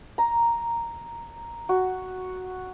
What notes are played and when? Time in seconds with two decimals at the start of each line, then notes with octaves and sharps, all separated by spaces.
0.18 A#5
1.69 F#4